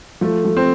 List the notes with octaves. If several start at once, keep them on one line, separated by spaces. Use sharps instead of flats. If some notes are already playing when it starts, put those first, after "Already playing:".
F3 A3
F3
C4